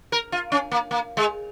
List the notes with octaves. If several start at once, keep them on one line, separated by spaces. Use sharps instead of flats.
A#4
F4
C#4
A#3
A#3
G#3